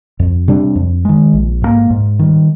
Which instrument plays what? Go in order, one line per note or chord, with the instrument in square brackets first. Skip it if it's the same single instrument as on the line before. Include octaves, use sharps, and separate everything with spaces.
[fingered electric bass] F2
C3 G3 D4
F2
D#3 G#3
A#1
G#2 F3 A#3
G#2
D#3 G3